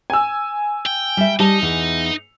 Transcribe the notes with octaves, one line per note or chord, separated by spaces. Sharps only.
G#5 E6
G5
G3 E5
G3 D#4 A5
E2 E3